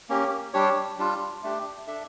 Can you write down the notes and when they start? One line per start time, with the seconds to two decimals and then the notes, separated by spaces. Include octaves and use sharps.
0.09 A#3 C#4 G4
0.54 G3 D4 G4 C#5
0.98 G3 D4 F4
1.43 A3 D4 G4
1.87 D4 A4 E5